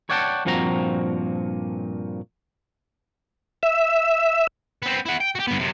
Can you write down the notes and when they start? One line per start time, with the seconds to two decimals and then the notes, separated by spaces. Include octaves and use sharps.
0.10 C#5 D5 F#5 G5 A5
0.45 G2 A#2 F3 C4 F#4 A#5
3.63 E5
4.82 B3 C4
5.05 E4 F#5
5.20 G5
5.35 F#4 G4
5.47 G2 B3
5.59 F#2 C3